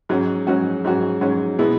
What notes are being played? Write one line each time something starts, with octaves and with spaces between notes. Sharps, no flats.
G#2 F#3 C#4 F#4
G#2 F#3 C#4 F#4
G#2 F#3 C#4 F#4
G#2 F#3 C#4 F#4
B2 G#3 B3 E4